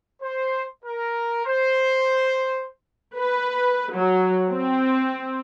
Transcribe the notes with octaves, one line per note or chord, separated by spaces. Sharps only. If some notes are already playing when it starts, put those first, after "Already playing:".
C5
A#4
C5
B4
F#3
C4